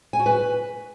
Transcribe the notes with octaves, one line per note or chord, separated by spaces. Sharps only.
G#5
F#4
B4